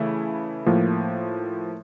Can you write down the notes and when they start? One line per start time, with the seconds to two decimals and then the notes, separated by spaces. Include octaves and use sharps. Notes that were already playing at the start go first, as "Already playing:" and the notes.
Already playing: C#3 E3 A3 E4
0.66 A2 F3 A#3